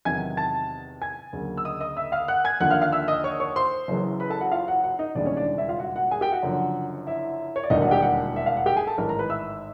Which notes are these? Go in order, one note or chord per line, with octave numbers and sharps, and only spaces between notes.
E2 C3 D#3 F#3 G#5 G#6
A5 A6
G#5 G#6
D2 C#3 F#3 A#3
E6
D#5 D#6
D#5 D#6
E5 E6
F5 F6
F#5 F#6
G#5 G#6
D#2 D3 F3 A#3 F#5 F#6
F5 F6
F5 F6
E5 E6
D#5 D#6
C#5 C#6
C#5 C#6
C5 C6
F#1 F#2 C#3 E3
B4 B5
A4 A5
F#4 F#5
F4 F5
F#4 F#5
F#4 F#5
D#4 D#5
E1 D#2 C#3 E3 G3 D4 D5
C#4 C#5
D4 D5
E4 E5
F4 F5
F#4 F#5
F#4 F#5
G#4 G#5
G4 G5
F#4 F#5
F#1 F#2 D3 F3
E4 E5
C#5
D5
E1 D#2 D3 G3 A#3 D#4 D#5
F#4 F#5
G4 G5
F#4 F#5
E5
F5
F#5
G4 G5
G#4 G#5
A4 A5
A1 G#2 D#3 A#4 A#5
A#4 A#5
B4 B5
E5 E6